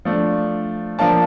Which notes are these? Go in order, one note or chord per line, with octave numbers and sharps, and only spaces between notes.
F3 A3 D4
F3 A#3 D4 A5